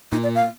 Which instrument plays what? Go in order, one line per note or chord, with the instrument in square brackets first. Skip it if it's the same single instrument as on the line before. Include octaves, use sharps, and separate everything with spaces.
[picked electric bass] A#2 [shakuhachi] D#4
[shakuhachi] D5
F5